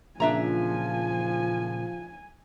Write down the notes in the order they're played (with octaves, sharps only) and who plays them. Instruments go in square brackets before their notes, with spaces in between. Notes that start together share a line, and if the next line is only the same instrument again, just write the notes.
[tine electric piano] A#2 C#3 A#3 [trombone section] F3 [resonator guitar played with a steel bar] D4 E5 A#5 [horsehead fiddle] G#5